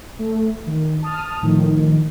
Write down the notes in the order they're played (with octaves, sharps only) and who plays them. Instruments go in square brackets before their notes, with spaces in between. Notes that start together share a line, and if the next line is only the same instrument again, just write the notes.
[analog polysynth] A3
D#3
A5 D#6 F6
A2 D#3 F3